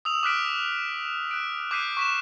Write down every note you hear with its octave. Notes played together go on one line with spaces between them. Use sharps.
D#6 E6 F7
D6 F6 F#6 B6 D7
F#6 D7
D6 F#6 G6 B6 C7 D#7
C#6 B6 E7